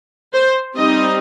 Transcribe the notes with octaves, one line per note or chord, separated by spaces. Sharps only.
C5
G3 C4 D#4 D#5